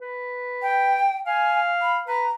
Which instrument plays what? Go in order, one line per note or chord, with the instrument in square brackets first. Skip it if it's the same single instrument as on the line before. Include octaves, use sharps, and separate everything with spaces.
[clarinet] B4
[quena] G5
[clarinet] F5 [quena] G#5
[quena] B5
[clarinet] B4 [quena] A#5